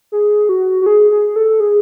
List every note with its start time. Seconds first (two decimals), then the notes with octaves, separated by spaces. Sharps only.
0.12 G#4
0.49 F#4
0.82 F#4
0.86 G#4
1.11 G#4
1.36 A4
1.60 G#4